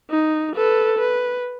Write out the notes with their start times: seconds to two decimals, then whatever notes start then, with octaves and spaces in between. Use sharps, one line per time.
0.10 D#4
0.56 A4 B4
0.97 B4